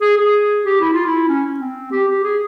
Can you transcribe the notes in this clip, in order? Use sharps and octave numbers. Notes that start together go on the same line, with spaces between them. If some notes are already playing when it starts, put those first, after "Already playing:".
G#4
G#4
G4
E4
F4
E4
C#4
C4
G4
G4
G#4